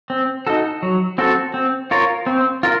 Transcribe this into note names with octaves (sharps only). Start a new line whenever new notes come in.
C4
D#4 F#4 A4
F#3
C4 F#4 A4
C4
F4 A#4 C#5
C4
F4 A#4